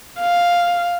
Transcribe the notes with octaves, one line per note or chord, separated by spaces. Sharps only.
F5